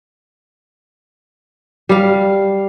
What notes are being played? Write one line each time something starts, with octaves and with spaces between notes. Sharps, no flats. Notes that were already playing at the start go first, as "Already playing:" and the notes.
G3 F5